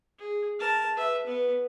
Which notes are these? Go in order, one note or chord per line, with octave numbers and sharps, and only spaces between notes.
G#4
A#4 A5
B4 E5
B3 B4